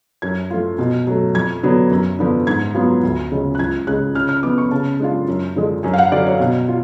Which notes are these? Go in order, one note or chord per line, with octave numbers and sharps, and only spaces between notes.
F#2 G#6
F3 A3 F4
B2
F#3 A3
F2 G#6
D3 F#3 B3
F#2
D3 F3 B3 D4
G#2 G#6
F#3 B3 F4
D2
C#3 F3 G#3 C#4
F#6
C#2 G#6
C#3 G#3 F#6
C#3 F6
F6
F3 B3 D6
C#6
C#3 A5
G#3 D4 F4
F#2
D3 F3 G#3
F#2 G#5
F5
F#5
D3 F#3 D5
C#5
B2
F4